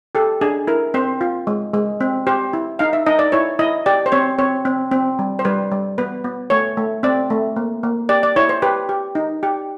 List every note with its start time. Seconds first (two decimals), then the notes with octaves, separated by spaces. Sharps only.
0.15 G4 A4
0.41 D4 G#4
0.67 E4 A#4
0.94 C4 C5
1.21 F4
1.47 G#3
1.74 G#3
2.01 C4
2.27 G4 C5
2.53 E4
2.79 D#4 F5
2.93 E5
3.06 D#4 D#5
3.19 D5
3.32 E4 C#5
3.59 E4 D#5
3.86 G4 D5
4.06 C5
4.12 C4 C#5
4.39 C4 C#5
4.65 C4
4.92 C4
5.19 G3
5.39 C5
5.45 G3 B4
5.71 G3
5.98 B3 B4
6.24 B3
6.50 A3 C#5
6.77 A3
7.03 C4 D5
7.30 A3
7.56 A#3
7.83 A#3
8.09 G4 D5
8.23 D5
8.36 E4 C#5
8.49 C5
8.62 G4 B4
8.89 G4
9.15 D#4
9.43 G4